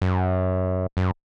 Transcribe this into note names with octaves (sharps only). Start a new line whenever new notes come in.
F#2
F#2